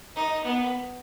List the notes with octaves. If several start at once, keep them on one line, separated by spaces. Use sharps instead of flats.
D#4
B3